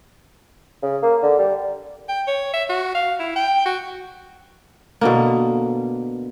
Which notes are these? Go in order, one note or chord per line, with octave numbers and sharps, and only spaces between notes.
C#3
A#3
D3
G3
G5
C#5
E5
F#4
F5
E4
G5
F#4
B2 D3 A#3